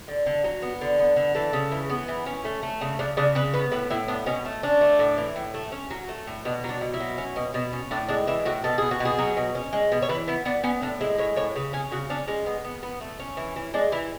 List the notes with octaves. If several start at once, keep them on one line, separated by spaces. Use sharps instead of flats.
D3
D3
F#3
B3
D3
B3
D3
E3 A4
C#3
E3
B3
E3
C#4
A3
A3
C#3
C#3 D4
C#3 D4
C#3 B4
B3 B4
A2 B4
A2 E4
B3 D4
B2 C#4
A3
C#4 D4
A3
A2
E3
A2
A3
C#4
F#3
A3
A2
B2 D4
F#3
D4
B2
E4
F#3
C#4
B2
B2
C#4
A2 D4
G#3 D4
E3 E4
A2 F#4
B2 A4
B3 G#4
F#4
B2
G#4
F#3
B2
C#4
G#3
B2
C#5
E3 B4
B3 E4
B3 D4
B3 C#4
A2 D4
G#3 E4
A2 C#5
A2 C#5
C#3 B4
C#4 G#4
C#3 F#4
C#4 D4
G#3 C#4
B3
B3
B3
A3
C#4
E3
E3
G#3 D4
E3 E4